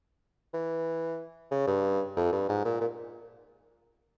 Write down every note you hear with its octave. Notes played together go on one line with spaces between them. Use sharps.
E3
C#3
G2
F2
G2
G#2
A#2
A#2